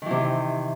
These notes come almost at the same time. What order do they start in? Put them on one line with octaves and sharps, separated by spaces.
D#3 E3 C3